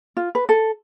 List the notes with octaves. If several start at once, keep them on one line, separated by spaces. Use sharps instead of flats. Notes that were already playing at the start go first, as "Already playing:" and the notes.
F4
B4
A4